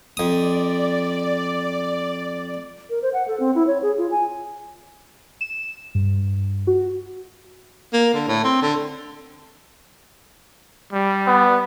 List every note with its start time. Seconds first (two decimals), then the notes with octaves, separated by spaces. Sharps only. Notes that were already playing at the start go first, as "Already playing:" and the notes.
0.17 F2 D5 D#6
2.90 A#4
3.02 C5
3.14 F#5
3.28 A4
3.40 C4
3.55 E4
3.67 C#5
3.82 G#4
3.98 F4
4.11 G#5
5.41 E7
5.95 G2
6.67 F#4
7.93 A#3
8.14 D3
8.28 A2
8.44 C4
8.62 D3
10.93 G3
11.27 B3